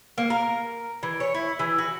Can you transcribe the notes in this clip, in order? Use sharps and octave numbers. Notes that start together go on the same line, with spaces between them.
A#3
A#4
E3
C#5
E4
E3
F#4